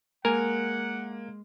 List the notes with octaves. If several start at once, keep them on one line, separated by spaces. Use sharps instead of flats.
G#3 A#3 A#4 F#5 G#5